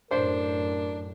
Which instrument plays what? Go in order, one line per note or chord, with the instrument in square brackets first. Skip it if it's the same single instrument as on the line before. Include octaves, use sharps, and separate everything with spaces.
[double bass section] F#2 A2 [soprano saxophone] D4 [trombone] A#4 [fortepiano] C5